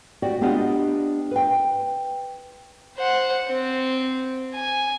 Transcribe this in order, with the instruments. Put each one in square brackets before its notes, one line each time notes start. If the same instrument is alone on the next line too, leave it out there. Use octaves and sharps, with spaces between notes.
[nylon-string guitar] F#4 G4 D5 G5
B3 D4 F4 G4 D5 D#5
B4 G5
[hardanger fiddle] C5 F#5
C4
G#5